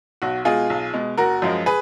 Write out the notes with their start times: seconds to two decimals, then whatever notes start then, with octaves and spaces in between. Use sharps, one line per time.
0.22 B1 F#4
0.45 B2 G#3 F4 G#4
0.70 B1
0.94 B2 G#3
1.18 F#1 F#4 A#4
1.42 F#2 F3 G#3
1.66 G#4 B4